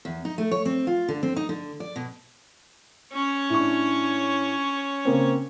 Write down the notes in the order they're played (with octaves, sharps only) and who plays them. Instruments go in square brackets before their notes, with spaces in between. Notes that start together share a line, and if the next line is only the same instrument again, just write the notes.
[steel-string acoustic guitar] E2
D#4
A3
C#5
C4
F4
D3
C4
D#4
D3
D5
B2
[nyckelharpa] C#4 C#5
[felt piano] A2 D4 C#6
C#3 A#3 C4